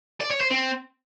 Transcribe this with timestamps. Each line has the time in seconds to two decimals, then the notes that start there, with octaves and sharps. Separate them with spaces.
0.20 D5
0.31 C#5
0.41 C5
0.51 C4